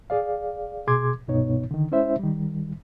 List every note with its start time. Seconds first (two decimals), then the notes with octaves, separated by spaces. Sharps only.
0.10 G#4 D5 F5
0.87 B2 G#4 C6 D6 G#6
1.28 C2 G2 B2 B3 D#4 C#5
1.71 D3 D#3
1.91 G#3 C#4 E4 C5 E5
2.19 D#3 G3